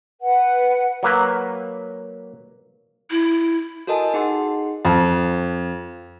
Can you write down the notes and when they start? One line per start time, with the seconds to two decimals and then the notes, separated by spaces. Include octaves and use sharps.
0.20 B4 F#5
1.03 F#3 A#3 B4
3.11 E4
3.87 F#4 A4 A#4 D#5 G#5 A5
4.14 D#4 G#4 F#5 C6
4.85 F2